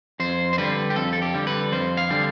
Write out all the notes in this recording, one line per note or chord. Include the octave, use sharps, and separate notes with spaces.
F2 C5
C5
D3 G3 B4
G4
F2 A4
A4
G4
D3 G3
B4
F2 C5
F5
D3 G3